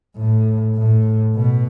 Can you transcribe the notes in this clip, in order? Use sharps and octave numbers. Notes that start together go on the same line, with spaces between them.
A2
A2
B2